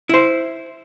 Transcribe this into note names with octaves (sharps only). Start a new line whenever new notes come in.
E4 C5